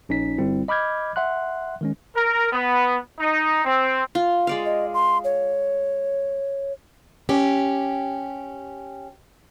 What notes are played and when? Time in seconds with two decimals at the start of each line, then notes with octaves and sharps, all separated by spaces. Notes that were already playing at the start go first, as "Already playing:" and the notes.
0.09 A#1 C#4 D#4 B6
0.38 G1 G3 C4 E4
0.68 D#5 B5 D6 F6 G6 G#6
1.16 E5 F#5 C6 F#6
1.81 D#3 G#3 C#4
2.16 A#4
2.52 B3
3.19 D#4
3.64 C4
4.15 F4
4.47 G#3 D5 F5
4.65 D#5
4.94 C6
5.24 C#5
7.29 C#4 G4